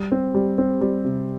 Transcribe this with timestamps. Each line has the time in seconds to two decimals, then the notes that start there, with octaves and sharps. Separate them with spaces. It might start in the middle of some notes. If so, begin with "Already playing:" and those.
Already playing: G3
0.12 C4
0.35 G3
0.58 C4
0.81 G3
1.04 C3